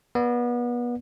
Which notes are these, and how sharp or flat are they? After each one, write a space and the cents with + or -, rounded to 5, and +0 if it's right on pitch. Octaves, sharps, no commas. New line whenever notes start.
B3 -30 D5 +0